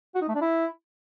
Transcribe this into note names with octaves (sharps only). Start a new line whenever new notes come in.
F#4
D#4
A3
D4
E4